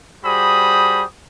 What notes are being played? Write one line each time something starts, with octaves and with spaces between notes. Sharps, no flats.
G3 F#4 G#4 C5 B5 D#6